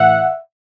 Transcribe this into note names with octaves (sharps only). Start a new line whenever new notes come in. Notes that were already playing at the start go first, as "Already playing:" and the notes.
Already playing: A2 E3 E5 F#5